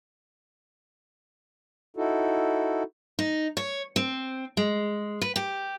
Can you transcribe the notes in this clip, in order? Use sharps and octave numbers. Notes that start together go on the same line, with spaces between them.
D#4 E4 F#4 A4
D#4
C#5
C4
G#3
B4
G4